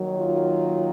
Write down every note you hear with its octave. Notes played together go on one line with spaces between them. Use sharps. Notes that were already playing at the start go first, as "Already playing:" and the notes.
Already playing: D#2 D#3 F#3
F4